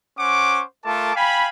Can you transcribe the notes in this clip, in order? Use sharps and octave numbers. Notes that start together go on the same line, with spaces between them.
C#4 C5 F#5 C#6 D6
A3 F4 A4 A#4 A5 D6
F5 G5 G#5 B5